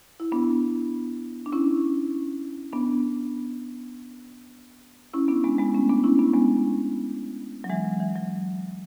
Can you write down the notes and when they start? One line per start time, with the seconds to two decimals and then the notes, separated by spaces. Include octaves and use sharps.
0.20 E4
0.32 B3 D4
1.46 D4
1.52 C#4 E4
2.73 B3 D4
5.13 C#4 E4
5.28 B3 D4
5.44 G#3 B3
5.58 G#3 B3
5.75 A3 C#4
5.89 B3 D4
6.04 C#4 E4
6.19 B3 D4
6.34 G#3 B3
7.64 F#3
7.69 E3 G#3
7.85 F#3
8.00 E3
8.15 F#3